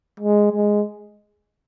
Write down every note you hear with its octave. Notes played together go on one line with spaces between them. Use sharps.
G#3
G#3